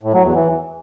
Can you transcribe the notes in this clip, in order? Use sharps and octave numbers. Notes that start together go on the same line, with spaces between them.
A2
F#3
E2
E3